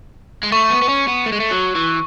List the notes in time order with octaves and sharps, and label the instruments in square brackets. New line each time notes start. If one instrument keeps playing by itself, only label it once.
[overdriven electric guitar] G#3
[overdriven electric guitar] A3 [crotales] C#6
[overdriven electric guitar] B3
B3
C#4
B3
A3
G#3
A3
F#3
E3